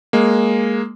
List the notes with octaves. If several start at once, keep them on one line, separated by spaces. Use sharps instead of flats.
G#3 A#3